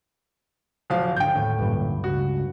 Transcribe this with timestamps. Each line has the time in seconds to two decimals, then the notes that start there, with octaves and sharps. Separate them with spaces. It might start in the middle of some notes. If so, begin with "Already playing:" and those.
0.90 D1 F3 F5
1.16 G#1 D3 G5 G6
1.36 D#2 A2
1.59 A1 D2 G2 A#2
2.04 C#2 F#4